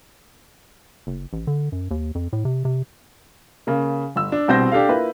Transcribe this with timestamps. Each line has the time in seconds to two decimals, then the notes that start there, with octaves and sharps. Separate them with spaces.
1.07 F#1
1.33 A1
1.47 D3
1.72 F#2
1.91 D#2
2.15 F2
2.33 A2
2.45 C3
2.65 C3
3.67 C#3 A#3
4.15 G1 E6
4.32 D4
4.48 C2 B2 C4 C5 G6 A#6
4.72 D4 G4 A4 F5
4.89 A#3 E4 F4 B4